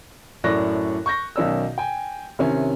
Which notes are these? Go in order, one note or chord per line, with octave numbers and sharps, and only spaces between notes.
F#2 A2 D5 C#6 F#6 A#6
C#6 G6 A#6
B1 D#3 C#4 D5 E6
G5 G#5
C3 D#3 C#4 E4 C#5